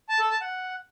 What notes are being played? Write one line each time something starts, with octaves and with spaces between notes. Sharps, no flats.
A5
A4
A5
F#5